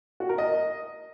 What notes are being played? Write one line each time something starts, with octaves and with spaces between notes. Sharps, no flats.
F#4
A#4
D#5